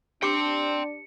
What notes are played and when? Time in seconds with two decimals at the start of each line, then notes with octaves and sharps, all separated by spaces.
0.23 D4 G4 G5 C6 D6 C#7